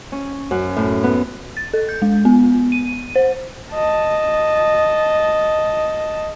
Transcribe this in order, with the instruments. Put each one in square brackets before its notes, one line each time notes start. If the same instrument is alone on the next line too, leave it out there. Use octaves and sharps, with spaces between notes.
[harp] C#4
F#2
A2
B3
[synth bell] A6
A4
G6
G#3
B3
D#7
C5
[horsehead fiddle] D#5 A5